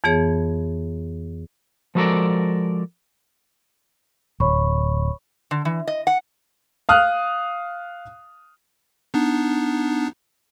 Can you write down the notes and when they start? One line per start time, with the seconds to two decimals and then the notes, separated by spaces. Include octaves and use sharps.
0.04 F2 E3 B3 G#4 C#5
1.95 F3 G#3 F#4 A4 A#4 D5
4.40 D1 C#5 B5 C#6
5.51 D3
5.65 E3
5.88 D#5
6.07 F#5
6.89 F5 D#6 F6 F#6
9.14 B3 D4 D#4